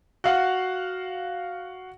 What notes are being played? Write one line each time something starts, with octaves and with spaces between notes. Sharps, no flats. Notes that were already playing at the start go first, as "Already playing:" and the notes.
F#4 F5 F#5